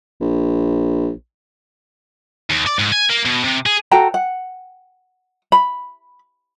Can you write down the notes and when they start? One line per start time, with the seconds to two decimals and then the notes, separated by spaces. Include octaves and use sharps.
0.21 A#1
2.50 D#2
2.67 D5
2.79 G#2
2.92 G#5
3.10 A#3
3.26 B2
3.44 C3
3.66 G#4
3.91 F#4 A4 G5 A#5
4.14 F#5
5.52 B5